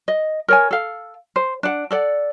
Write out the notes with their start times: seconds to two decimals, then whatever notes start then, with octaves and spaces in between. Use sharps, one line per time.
0.08 D#5
0.48 A#4 C#5 G#5
0.71 A4 F5
1.36 C5
1.63 D4 F#5
1.91 A4 D5 F#5